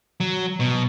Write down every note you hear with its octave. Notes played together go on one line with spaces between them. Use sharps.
F#3
B2